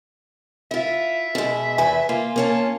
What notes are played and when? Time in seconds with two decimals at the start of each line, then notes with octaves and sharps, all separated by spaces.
0.71 E4 F4 E5
1.35 B2 G#3
1.78 E2 B4 G#5
2.09 A#3 F4
2.36 A#3 C#4 A5